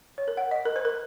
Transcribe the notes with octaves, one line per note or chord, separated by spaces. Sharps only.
C#5
A#4
F#5
D#5
A#4
C5
A#4